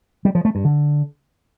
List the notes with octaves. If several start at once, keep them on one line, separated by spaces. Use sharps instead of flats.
G3
F3
A3
G2
D3